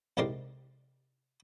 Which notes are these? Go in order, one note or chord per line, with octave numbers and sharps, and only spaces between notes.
C2 G#2 C3 A#4 D5 C6